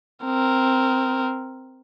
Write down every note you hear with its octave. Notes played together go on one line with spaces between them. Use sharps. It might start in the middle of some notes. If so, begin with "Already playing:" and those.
C4 A#4